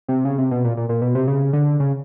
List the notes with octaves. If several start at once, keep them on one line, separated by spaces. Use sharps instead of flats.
C3
C#3
C3
B2
A#2
A#2
A#2
B2
C3
C#3
D3
C#3